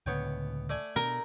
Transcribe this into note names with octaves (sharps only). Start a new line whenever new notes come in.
C#2 A2 D3 B3 C#5 G5
A3 D5 G#5
B2 A#4